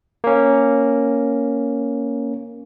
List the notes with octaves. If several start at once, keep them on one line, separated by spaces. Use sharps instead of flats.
A#3 C#4